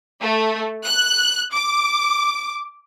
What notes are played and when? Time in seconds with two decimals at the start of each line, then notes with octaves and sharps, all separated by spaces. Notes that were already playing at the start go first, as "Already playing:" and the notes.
0.22 A3
0.85 F#6
1.53 D6